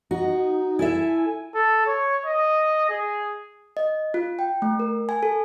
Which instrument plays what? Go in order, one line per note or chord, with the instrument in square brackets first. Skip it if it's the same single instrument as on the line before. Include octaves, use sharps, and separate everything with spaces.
[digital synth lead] D#4 [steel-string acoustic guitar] F#4
[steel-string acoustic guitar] E4 A4 E5 [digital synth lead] G#5
[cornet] A4
C#5
D#5
G#4
[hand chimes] D#5
F4
G5
A3
A#4
G#5
A4